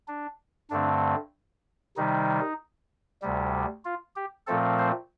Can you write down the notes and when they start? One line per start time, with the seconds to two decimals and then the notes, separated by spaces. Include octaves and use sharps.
0.08 D4
0.70 G2 D3 A3 C4 D4
1.97 C3 D#3 G3 D#4
3.22 D2 C3 G3
3.85 F4
4.16 G4
4.47 A#2 F3 A3 C4 A4
4.79 C5